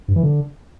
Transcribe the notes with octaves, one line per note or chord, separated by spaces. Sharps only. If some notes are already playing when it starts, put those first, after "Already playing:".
G2
E3
D3